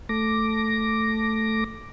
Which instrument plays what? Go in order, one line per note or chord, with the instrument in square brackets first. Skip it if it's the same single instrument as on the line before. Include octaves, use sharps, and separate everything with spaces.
[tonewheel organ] A3 D6 A#6